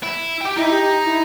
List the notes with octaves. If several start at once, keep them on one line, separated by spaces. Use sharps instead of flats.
E4
G4 G5
D#4 E4 D#5
G4
E4